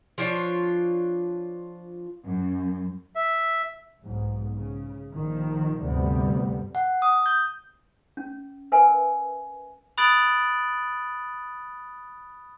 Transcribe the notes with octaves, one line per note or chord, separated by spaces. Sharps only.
F3 D4 F4 C#5
F#2
E5
B1 G#2
C#3
A#1 D#3 F3
D2 G2 C3 G3 B3
F#5
D#6
G6
C#4
A#4 B4 E5 G#5
B5 D#6 F#6 A6 D7 F#7